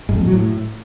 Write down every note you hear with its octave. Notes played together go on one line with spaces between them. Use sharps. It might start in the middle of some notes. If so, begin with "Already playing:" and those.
G#2
F2
A#2
F#3
A2